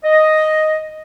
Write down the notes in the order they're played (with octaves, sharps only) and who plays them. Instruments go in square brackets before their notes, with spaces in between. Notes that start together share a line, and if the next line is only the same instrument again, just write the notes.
[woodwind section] D#5